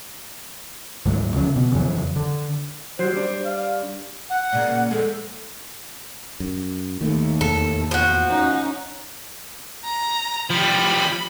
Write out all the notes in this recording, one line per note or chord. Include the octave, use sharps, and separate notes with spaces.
D2 G#2 D3 F#3
C#3 F3 F#3
B2
F2 C#3 E3 F#3
D3
F#3 G3 C5
G3 D4
F5
F#5
A#2 C#3 A#3 D5
E2 F3 G#3 A4
F#2
D#2 A2 D#3 A3
E2 A4
F3 F#4
C#4 D#4
A#5
F3 G3 B5